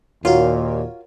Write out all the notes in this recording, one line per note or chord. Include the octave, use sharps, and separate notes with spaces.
D#2 A#2 F4 F#4 A#4 C#5